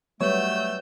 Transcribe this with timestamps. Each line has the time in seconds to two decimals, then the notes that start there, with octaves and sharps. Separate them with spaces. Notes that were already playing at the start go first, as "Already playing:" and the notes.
0.21 F#3 G3 A3 B3 C#5 E6 G6